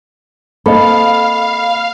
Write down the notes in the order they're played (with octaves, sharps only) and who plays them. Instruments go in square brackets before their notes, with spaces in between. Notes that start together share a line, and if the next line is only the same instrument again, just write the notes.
[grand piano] A#3 C4 [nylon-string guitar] A4 [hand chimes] D#5 B5 [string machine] F5